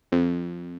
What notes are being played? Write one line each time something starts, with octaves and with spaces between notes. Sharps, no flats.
F2